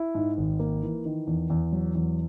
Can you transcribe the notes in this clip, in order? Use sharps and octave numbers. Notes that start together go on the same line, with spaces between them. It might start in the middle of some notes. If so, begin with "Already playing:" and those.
Already playing: E4
G#2
G#1
A#3
E3
D#3
E2
E2
F#3
E2